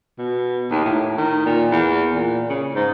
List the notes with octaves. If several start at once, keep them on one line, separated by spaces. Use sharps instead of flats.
B2
D#2
A2
D#3
A#2
E2
A#2
C#3
G#2